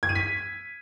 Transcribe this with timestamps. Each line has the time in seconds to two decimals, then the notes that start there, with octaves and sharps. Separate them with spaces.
0.03 G#6
0.09 D#7
0.15 B6